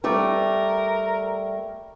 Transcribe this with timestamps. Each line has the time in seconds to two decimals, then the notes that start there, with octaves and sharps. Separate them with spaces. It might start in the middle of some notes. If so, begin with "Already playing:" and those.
0.04 G3 A3 A#4 D5